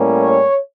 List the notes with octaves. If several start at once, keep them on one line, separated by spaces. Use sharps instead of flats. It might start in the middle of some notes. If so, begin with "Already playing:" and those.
Already playing: A2 G3 A#3 C#4
C#5